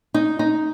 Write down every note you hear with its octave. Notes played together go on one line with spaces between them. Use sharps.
D#4
D#4